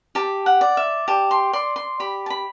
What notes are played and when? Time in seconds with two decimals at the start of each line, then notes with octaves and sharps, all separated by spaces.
0.15 G4 A5
0.46 F#5
0.61 D5
0.77 E5
1.08 G4 A5
1.31 C6
1.53 D5 C6
1.76 C6
2.00 G4 B5
2.26 A5
2.30 B5